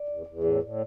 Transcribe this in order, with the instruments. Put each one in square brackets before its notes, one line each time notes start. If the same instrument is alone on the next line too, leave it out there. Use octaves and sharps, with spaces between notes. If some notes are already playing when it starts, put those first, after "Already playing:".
Already playing: [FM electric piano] D5
[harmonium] E2
E2
A2
A2